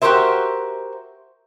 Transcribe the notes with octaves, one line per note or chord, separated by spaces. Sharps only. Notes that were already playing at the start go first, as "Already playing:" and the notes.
F#4 G4 A4 A#4 C5 E5